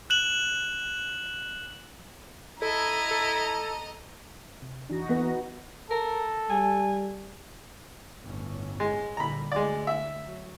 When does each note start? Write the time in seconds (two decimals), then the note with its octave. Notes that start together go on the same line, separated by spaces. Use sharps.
0.10 F#6 E7 F#7
2.62 E4 A4 D#5 A#5
3.11 A4
4.62 C3
4.90 E2 E3 D4 D#4 F#4 A#6
5.09 E3 B3
5.90 A4 A#4
6.50 G3 G#5
8.23 G1 A2 C#4
8.80 G#3
9.17 A#2 D3 G3 A#5 B5
9.52 D2 G#3 D5
9.87 E5
10.26 F#3